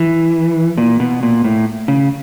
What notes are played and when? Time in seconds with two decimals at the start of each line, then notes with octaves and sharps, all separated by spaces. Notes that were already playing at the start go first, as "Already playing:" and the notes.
Already playing: E3
0.78 A#2
1.00 B2
1.23 A#2
1.44 A2
1.88 C#3